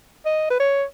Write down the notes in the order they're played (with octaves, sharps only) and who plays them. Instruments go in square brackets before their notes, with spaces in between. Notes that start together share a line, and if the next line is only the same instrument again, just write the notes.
[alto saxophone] D#5
B4
C#5